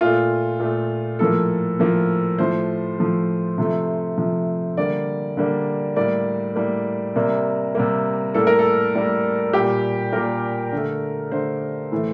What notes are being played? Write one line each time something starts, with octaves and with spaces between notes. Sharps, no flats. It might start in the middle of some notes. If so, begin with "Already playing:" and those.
A#2 A3 F4
A#2 A3
A2 F3 A#3 A4
A2 F3 A#3
A2 F3 A3 C5
A2 F3 A3
C3 F3 A3
C3 F3 A3
D3 G3 A#3 D5
D3 G3 A#3
A2 G3 A#3 D5
A2 G3 A#3
C3 G3 A#3
C3 G3 A#3
A2 G3 A#3 A4
A#4
A4
A2 G3 A#3
A#2 G3 A#3 G4
A#2 G3 A#3 A#4
D3 A3
D3 A3 C5
A2 E3 A3